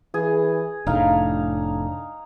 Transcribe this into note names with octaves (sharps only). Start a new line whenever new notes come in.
E3 G#4
F1 A2 D4 D#4 F5